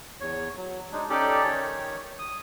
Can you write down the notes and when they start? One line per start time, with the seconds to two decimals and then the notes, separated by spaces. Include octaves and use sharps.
0.20 E2 C#5
0.57 F#3
0.92 G#3 D4 D#4
1.10 C#4 D#4 G4 A4 D5
1.44 D#3 C#5
2.19 D#6